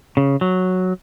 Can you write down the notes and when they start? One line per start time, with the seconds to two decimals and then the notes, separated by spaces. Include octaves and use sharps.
0.17 C#3
0.41 F#3